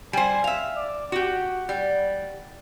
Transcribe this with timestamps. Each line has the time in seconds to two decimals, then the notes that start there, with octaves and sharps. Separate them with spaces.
0.13 G3 C5 G#5
0.44 E5 F5
0.76 D5
1.12 F#4 G4 F#5
1.69 G3